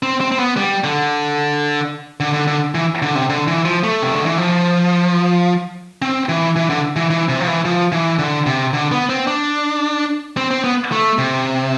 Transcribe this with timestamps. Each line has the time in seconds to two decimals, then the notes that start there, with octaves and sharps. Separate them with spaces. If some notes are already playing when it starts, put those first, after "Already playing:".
0.03 C4
0.21 C4
0.32 C4
0.39 B3
0.57 G3
0.84 D3
2.20 D3
2.34 D3
2.47 D3
2.75 E3
3.02 D3
3.15 C3
3.29 D3
3.48 E3
3.65 F3
3.84 A3
4.02 C3
4.15 D3
4.26 E3
4.38 F3
6.02 C4
6.29 E3
6.56 E3
6.70 D3
6.96 E3
7.10 E3
7.29 C3
7.41 F3
7.47 E3
7.65 F3
7.92 E3
8.19 D3
8.46 C3
8.74 D3
8.92 B3
9.10 C4
9.28 D4
10.37 C4
10.51 C4
10.64 B3
10.92 A3
11.18 C3